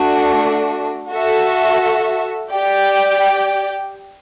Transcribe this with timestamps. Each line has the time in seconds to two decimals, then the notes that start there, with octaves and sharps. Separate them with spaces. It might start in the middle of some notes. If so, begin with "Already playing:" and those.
Already playing: A3 D4 F#4
1.12 F#4 A4 E5
2.52 G4 D5 G5